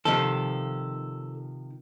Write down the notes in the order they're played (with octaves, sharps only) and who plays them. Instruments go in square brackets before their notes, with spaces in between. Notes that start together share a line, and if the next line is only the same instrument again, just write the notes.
[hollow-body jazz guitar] C3 D#3 F3 [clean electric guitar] A4